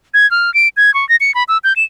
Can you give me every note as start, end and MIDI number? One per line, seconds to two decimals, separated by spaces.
0.14 0.29 92
0.31 0.53 89
0.54 0.68 98
0.77 0.93 92
0.94 1.07 85
1.09 1.16 94
1.21 1.34 97
1.35 1.44 83
1.48 1.58 88
1.64 1.73 91
1.76 1.84 100